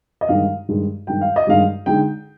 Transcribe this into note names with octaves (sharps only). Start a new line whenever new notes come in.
D#5
G2 D#3 G#3 F5
G2 D#3 G#3
G2 D#3 G#3 G5
F5
D#5
G2 D#3 G#3 F5
D3 G#3 D#4 G5